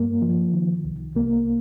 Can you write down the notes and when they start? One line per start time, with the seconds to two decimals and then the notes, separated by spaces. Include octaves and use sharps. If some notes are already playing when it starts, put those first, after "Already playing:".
Already playing: G2 A#3
0.22 F3
0.54 D#3
0.85 C2
1.16 C2 A#3